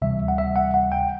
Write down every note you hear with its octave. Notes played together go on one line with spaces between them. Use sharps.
D2 C3 E3 G3 E5
F#5
E5
F#5
F#5
G5